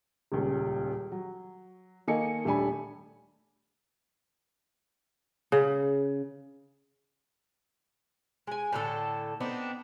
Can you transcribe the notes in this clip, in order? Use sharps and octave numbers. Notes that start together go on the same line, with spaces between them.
D#1 C#2
F#3
D#3 A#3 A4 D#5 G#5 C#7
D#1 A3 D4 G#5 B5
C#3
G#3 G#5
A2 D3 A4
B3 C4 D4 D#4